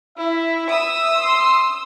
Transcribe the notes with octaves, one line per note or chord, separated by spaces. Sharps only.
E4 E5
D#6 E6
C6